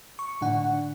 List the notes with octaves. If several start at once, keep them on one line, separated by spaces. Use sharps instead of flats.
C#6
A2 D3 D4 F#5